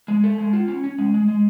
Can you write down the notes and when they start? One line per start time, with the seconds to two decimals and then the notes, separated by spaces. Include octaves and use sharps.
0.08 G#3
0.24 A4
0.38 G#3
0.53 F4
0.68 C#4
0.84 C#4
0.98 G#3
1.14 G#3
1.28 G#3